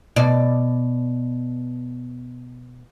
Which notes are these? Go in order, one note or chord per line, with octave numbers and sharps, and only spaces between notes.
B2 D5